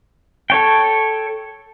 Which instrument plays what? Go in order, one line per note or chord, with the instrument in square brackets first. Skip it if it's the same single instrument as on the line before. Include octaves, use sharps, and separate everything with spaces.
[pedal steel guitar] A4 C#5 G5